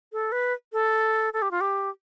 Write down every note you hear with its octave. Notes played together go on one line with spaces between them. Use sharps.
A4
B4
A4
A4
G4
F4
G4